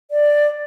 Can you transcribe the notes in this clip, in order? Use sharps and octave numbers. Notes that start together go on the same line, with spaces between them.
D5